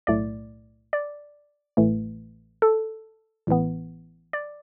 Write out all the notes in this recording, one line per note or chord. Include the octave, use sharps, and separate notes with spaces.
B1 A2 A3 D5
D5
A1 A2 E3 A3
A4
A1 A2 E3 B3
D5